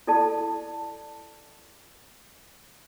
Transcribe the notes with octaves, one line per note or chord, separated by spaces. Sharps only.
E4 A4 D5 A5